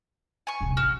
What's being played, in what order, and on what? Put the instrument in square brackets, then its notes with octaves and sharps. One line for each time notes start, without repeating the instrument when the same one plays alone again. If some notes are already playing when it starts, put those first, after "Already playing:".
[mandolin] G#5 C#6
[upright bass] D#1 C3
[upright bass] A1 [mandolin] F#4 F6